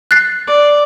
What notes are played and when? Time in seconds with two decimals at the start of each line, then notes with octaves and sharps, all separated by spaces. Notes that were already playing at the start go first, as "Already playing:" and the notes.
0.11 F#6 A6 C7
0.47 D5